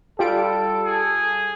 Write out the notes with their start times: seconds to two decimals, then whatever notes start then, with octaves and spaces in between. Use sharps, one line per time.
0.19 G3 F4 A4 D7
0.86 G#4